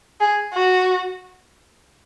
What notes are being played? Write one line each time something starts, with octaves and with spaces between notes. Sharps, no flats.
G#4
F#4